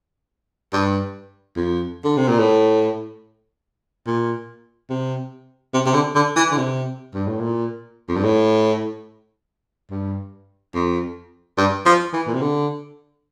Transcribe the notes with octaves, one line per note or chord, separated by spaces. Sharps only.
G2
F2
D3
C3
A#2
A2
A#2
C3
C3
C3
D3
D3
E3
D3
C3
G2
A2
A#2
F2
G2
A2
G2
F2
G2
F3
E3
A#2
C3
D3